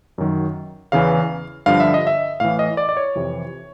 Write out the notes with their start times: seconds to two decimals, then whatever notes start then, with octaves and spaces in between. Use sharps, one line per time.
0.18 F#2 D#3 F#3
0.92 E2 C#3 E3 F5
1.66 G2 D3 F3 F5
1.80 E5
1.94 D#5
2.07 E5
2.40 A2 E3 F5
2.59 D#5
2.77 D5
2.89 D5
2.97 C#5
3.15 F2 C3 E3